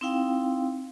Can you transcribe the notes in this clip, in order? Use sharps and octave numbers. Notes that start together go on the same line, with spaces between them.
C4 D#4 E4 F5 G5